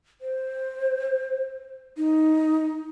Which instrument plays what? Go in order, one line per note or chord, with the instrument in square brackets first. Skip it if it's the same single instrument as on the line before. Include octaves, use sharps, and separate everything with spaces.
[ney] C5
D#4